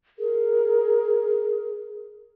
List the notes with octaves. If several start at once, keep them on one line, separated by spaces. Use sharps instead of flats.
G#4 A#4